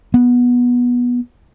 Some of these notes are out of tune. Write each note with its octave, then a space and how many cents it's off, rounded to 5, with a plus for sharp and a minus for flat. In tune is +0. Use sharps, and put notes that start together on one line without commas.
B3 -15